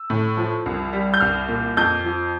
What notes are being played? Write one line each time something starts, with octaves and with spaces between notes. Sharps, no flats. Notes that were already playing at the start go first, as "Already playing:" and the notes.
Already playing: E6
A2
F3
C2
G3
G6
C2 F6
A#2
F2 G6
F3